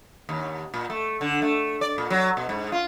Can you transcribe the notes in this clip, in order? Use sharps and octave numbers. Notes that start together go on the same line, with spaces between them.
D#2
A#2
A3
D3
A3
D5
A#2
F#3
B2
G#2
F4